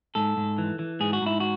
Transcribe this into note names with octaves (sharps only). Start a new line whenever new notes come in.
G#2 A4
G#2
E3
E3
G#2 G#4
F#4
G#2 E4
F#4